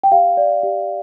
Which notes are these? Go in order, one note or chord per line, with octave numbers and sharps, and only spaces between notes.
G5
G4 F5
D5
G4